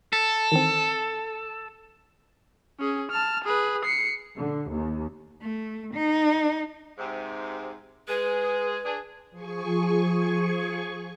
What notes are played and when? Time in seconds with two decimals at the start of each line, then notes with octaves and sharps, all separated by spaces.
0.13 A4 F6 G6 B6
0.52 D#3 E3 C4
2.79 C#4 G#4
3.11 A5 F6
3.44 G#4 B4
3.84 C7 C#7
4.36 D3
4.72 D#2
5.42 A3
5.94 D#4
6.98 G#2 C3
8.08 G#3 G#4 B4
8.84 D4 G#4
9.31 F3 G#4 G#5 C#6